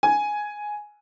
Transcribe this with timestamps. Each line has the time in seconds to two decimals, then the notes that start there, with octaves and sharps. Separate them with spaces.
0.03 G#5